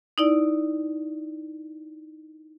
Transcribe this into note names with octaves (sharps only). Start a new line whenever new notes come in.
D#4 E4 D5